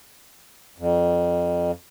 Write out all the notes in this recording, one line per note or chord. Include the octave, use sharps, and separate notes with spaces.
F2